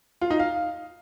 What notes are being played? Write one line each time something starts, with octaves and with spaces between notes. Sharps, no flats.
F4
D#4
F5